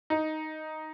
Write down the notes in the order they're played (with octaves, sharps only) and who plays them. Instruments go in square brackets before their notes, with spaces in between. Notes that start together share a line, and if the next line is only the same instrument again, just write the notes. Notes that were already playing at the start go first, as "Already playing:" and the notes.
[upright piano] D#4